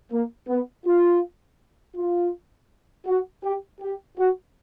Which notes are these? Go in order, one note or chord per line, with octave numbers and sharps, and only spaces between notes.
A#3
B3
F4
F4
F#4
G4
G4
F#4